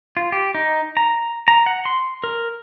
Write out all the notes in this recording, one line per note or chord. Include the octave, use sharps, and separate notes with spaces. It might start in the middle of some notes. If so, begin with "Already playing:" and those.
F4
G4
D#4
A#5
A#5
F#5
C6
A#4